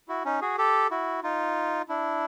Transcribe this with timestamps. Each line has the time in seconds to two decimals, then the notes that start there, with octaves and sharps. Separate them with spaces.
0.08 E4 F#4
0.25 C#4 D#4
0.41 F#4 G#4
0.58 G4 A4
0.91 E4 F#4
1.23 D#4 F4
1.89 D4 E4